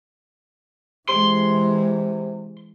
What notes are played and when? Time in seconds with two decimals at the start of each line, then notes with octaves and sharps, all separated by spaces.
1.09 C3 E3 G#3 C6